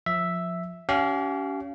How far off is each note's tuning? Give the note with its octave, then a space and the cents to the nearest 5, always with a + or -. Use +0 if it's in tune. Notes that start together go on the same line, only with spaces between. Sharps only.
F3 +20 E5 +0
C#4 +30 G4 -40 F5 -15